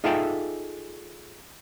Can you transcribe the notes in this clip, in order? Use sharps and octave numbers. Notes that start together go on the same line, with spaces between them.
D#4 F4 G#4 A4 E5 G5